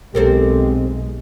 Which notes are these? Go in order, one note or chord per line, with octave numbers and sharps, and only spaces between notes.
B1 G#3 C4 G4 A4 A#4